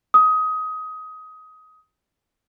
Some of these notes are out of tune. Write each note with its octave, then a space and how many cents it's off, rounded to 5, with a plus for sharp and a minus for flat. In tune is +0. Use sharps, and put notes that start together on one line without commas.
D#6 +20